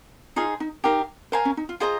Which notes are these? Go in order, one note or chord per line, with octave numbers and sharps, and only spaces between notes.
D#4 F4 G#4 C5
D#4
D#4 G4 A#4 F5
A#4 C5 F5 G#5
C#4
D#4
F4
F4 G#4 C5 D#5 A#5